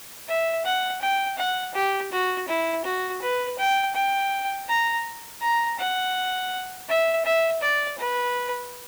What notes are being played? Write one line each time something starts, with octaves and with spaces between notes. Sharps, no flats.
E5
F#5
G5
F#5
G4
F#4
E4
F#4
B4
G5
G5
A#5
A#5
F#5
E5
E5
D5
B4